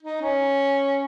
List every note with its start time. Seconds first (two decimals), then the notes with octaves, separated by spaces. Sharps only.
0.02 D#4
0.21 C#4